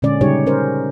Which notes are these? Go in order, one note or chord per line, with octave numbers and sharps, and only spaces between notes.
A#2 D3 G#3 C#4 D5
C#3 G3 D#4 G4 C#5
C#4 A#4 C5